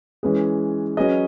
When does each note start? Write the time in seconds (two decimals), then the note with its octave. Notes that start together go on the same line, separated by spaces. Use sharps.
0.23 E3 G#3 C#4 G#4 B4
0.97 F#3 C#4 G#4 B4 D#5